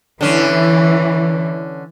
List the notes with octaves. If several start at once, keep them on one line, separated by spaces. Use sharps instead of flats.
D3 E3 C#4